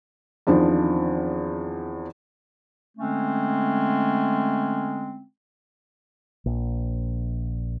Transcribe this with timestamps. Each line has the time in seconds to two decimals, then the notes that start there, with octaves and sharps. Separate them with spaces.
0.47 E2 D#3 F3 C4 D4
2.98 D3 G#3 A3 C4 C#4
6.46 A#1